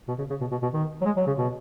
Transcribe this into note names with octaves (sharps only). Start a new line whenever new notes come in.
B2
C#3
C#3
B2
B2
B2
D#3
F#3
G#3
F#3
C#3
B2